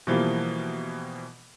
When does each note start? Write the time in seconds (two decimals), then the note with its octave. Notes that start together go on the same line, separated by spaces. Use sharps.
0.07 B2 E3 F3 G3 A#3